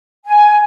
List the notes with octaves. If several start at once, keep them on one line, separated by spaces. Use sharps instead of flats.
G#5